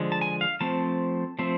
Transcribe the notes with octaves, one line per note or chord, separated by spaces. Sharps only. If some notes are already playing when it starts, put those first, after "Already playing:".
Already playing: D3 F3 G#3
A5
G#5
F5
F3 A3 C4 A5
F3 A3 C4